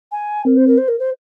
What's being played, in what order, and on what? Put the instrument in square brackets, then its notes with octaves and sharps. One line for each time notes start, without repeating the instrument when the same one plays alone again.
[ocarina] G#5
[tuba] C4 [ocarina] A#4
[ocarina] C5
A#4
C5
A#4
C5